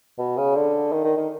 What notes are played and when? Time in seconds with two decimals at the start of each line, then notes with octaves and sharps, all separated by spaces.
0.19 B2
0.37 C#3
0.56 D3
0.92 D#3
1.04 D#3
1.17 D#3